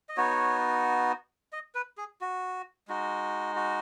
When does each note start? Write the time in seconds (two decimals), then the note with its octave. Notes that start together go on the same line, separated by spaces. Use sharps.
0.09 D#5
0.17 B3 D#4 F#4 C#5
1.52 D#5
1.75 B4
1.98 G#4
2.21 F#4
2.88 G#3 D#4 F#4
3.56 F#4